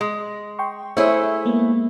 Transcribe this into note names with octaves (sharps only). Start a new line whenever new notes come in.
G#3
G5 C6 C#6
A3 E4 G#4 C5 C#5 E5
G#3 A#3 B3